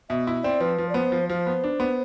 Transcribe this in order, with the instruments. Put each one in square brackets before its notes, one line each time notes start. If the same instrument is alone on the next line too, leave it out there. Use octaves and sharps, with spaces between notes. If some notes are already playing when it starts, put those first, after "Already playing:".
[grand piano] B2 [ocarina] E5
[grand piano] E4
[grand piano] C4 [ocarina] D5
[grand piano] F3 [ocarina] B4
[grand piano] F3
[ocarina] D5
[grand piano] B3 [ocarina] C5
[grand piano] F3
[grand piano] F3 [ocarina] C5
[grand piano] B3
D4
B3